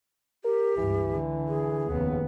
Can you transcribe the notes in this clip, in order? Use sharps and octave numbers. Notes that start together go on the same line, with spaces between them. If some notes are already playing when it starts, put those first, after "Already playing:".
G4 A#4
C#2 G2 E3
D3
G#4
F1 D#2 C#3 B3